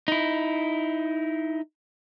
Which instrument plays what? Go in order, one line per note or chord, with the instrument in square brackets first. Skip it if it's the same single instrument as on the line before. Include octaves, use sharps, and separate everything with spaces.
[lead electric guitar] D#4 E4